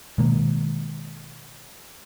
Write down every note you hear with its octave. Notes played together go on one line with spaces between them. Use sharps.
B2 D#3 G#3 A#3